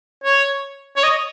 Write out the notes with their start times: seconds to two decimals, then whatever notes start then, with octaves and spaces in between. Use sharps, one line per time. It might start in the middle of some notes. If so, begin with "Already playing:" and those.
0.24 C#5
0.96 C#5
1.03 D#5